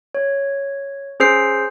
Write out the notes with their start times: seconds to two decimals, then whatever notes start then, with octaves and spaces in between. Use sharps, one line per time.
0.15 C#5
1.20 C#4 G#4 C5 E6 C7